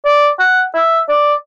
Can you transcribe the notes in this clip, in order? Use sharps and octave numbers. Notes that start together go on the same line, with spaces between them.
D5
F#5
E5
D5